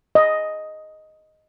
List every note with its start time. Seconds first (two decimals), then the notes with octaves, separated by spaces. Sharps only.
0.15 D#5